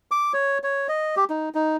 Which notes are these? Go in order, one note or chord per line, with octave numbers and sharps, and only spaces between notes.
D6
C#5
C#5
D#5
G4
D#4
D#4